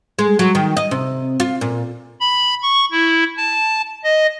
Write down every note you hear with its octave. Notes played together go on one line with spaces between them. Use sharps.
G#3
F#3
D#3
D#5
C3
F4
A#2
B5
C#6
E4
A5
D#5